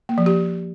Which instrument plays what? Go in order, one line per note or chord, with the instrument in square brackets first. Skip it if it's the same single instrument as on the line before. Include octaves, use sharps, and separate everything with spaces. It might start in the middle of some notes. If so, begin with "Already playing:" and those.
[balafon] A#3
F3
G4